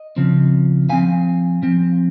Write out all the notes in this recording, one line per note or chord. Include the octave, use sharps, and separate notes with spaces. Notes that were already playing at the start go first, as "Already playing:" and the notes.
Already playing: D#5
C#3 F3 C4
F3 C4 F5 G#5
F3 C4